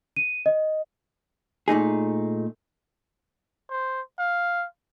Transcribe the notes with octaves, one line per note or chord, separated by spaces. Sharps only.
D#7
D#5
A#2 A3 D#4 G#4
C5
F5